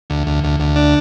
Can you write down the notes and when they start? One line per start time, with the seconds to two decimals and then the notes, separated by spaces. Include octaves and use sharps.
0.10 D2
0.27 D2
0.44 D2
0.60 D2
0.76 D4